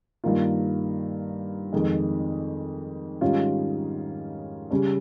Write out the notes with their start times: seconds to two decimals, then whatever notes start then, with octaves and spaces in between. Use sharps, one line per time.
0.24 G2 D#3 A#3 F4
1.73 F2 D#3 G#3
3.21 G#2 D#3 G3 C#4 F4
4.71 C#3 G3 C#4